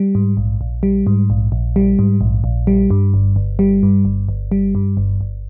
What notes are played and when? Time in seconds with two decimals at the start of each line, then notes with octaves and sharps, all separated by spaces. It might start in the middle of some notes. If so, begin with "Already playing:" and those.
Already playing: G3
0.15 G#2
0.37 A#1
0.61 A#1
0.83 G3
1.07 G#2
1.30 A#1
1.52 A#1
1.76 G3
1.99 G#2
2.21 A#1
2.44 A#1
2.67 G3
2.90 G2
3.14 G1
3.36 G1
3.59 G3
3.83 G2
4.05 G1
4.29 G1
4.52 G3
4.75 G2
4.97 G1
5.21 G1